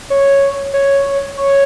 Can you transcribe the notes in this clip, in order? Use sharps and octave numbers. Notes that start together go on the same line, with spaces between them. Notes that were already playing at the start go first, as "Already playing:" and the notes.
C#5
C#5
C#5